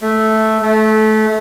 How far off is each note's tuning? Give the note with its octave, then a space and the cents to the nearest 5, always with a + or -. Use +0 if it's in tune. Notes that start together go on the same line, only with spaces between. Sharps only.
A3 -5
A3 -20